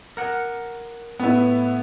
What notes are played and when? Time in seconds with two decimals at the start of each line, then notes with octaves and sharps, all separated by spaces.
0.17 A#4 F#5
1.20 A2 B3 E4 B4